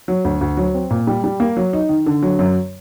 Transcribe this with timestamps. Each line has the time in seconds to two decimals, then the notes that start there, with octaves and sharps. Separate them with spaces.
0.08 F#3
0.25 D2
0.41 D2
0.57 F#3
0.74 C4
0.90 A#2
1.07 G3
1.24 G3
1.40 A#3
1.57 F#3
1.73 D#4
1.89 D#3
2.06 D3
2.23 F#3
2.39 F#2